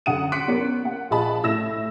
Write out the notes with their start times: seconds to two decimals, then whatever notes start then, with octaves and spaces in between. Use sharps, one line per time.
0.06 F#2 D3 F#5 D#6 D#7
0.32 C6 D6 F#6 B6 C#7 D7
0.48 B3 C#4 A#4
0.83 A#3 F#5
1.10 A#1 F4 G#4 D#5 A5 B5
1.43 A2 E4 E6 A#6 E7